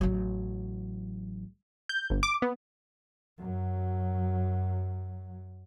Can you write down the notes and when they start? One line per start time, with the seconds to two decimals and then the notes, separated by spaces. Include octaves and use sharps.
0.01 A1 F#3
1.89 G6
2.10 G1
2.23 D6
2.42 B3
3.38 F#2 F#3